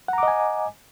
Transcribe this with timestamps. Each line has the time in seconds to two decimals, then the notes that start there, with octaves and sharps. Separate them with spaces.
0.08 F#5
0.13 A#5
0.18 D6
0.23 D#5
0.28 G#5